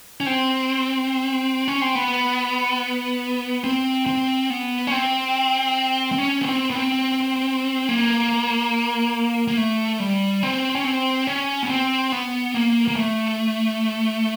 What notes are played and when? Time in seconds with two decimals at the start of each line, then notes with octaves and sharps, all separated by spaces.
0.20 C#4
0.26 C4
1.68 C#4
1.81 C4
1.95 B3
3.64 C4
4.07 C4
4.50 B3
4.87 C#4
4.92 C4
6.12 C4
6.18 C#4
6.41 B3
6.47 C4
6.70 B3
6.75 C4
7.89 A#3
9.48 A#3
9.57 A3
10.00 G3
10.43 C4
10.75 C#4
10.84 C4
11.27 C#4
11.63 B3
11.70 C4
12.12 B3
12.54 A#3
12.88 A#3
12.96 A3